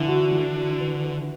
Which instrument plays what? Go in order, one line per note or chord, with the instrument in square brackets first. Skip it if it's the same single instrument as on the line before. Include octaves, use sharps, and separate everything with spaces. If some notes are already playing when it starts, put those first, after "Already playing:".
Already playing: [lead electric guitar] D3 [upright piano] E3
[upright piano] F#4
E3
F#4
B4
B4